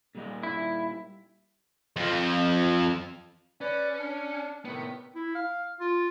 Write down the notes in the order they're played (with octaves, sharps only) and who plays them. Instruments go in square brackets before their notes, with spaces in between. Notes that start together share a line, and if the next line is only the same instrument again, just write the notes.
[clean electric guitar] A#2 G3 D#5
[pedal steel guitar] E4
[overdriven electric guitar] F2 F3
[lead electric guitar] C#4 [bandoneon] B4 D5
[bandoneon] D4
[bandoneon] A2 C3 D#3 [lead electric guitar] B3
[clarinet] E4
F5
F4